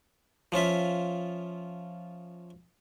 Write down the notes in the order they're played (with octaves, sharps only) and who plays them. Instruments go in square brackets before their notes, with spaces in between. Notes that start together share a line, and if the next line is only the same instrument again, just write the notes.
[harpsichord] F3 C#4 F4 E5